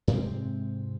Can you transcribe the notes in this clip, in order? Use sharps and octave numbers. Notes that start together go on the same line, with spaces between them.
G#2 C3 G#3 C4